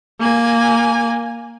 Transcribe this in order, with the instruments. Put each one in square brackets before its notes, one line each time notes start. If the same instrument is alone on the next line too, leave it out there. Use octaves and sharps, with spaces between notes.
[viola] A#3 G#5